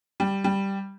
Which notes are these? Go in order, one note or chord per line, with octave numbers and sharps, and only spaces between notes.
G3
G3